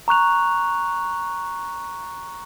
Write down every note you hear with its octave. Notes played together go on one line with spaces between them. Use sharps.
A#5 C#6 F#6 F7